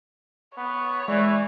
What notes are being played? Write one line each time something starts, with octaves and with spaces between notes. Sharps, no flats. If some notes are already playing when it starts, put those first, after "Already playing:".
B3 C#5
E3 G#3 D5